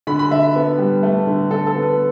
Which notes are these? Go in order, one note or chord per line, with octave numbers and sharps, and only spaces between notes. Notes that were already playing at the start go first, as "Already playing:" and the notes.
D3 B5
B5
D3 E5
B3
G3
A3
D3
D3 A4
A4
B3
B4